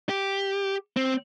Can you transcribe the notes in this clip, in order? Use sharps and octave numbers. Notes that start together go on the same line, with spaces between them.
G4
C4